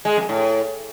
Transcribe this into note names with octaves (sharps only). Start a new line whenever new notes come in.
G#3
F2
A2